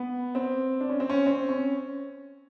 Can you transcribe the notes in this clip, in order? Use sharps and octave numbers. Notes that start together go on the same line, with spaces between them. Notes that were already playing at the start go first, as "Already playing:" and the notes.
Already playing: B3
C4
D4
C#4
C4
C#4
C4
C#4